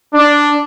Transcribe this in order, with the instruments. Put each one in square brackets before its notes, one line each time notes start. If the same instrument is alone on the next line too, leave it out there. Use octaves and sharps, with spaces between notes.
[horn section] D4